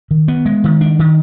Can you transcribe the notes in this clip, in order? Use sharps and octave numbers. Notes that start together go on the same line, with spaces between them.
D#3
B3
G#3
D#3
D4
D#3